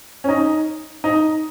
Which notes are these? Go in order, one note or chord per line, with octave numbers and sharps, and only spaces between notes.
C#4
D#4
D#4